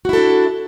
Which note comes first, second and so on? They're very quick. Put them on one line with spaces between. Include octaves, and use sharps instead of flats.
F#4 E4 A4 D4